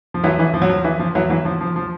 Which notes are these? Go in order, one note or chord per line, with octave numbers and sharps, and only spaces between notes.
F3
E3 F#3
E3
F3
F#3
F3
E3
F3
E3 F#3
E3 F#3
F3
F3
F3